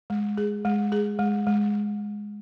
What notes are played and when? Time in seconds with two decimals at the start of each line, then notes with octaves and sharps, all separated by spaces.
0.10 G#3
0.37 G#4
0.65 G#3
0.92 G#4
1.19 G#3
1.47 G#3